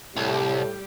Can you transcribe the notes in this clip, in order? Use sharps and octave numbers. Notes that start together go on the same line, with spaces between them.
C2 A2 G3 G4